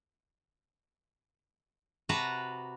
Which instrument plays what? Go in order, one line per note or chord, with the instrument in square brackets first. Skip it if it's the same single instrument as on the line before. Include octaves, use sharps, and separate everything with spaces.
[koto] C3 F#4 B4 A5 A#5